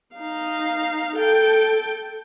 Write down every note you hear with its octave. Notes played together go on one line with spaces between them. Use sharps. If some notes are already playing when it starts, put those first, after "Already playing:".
D#4 F5
A4 G5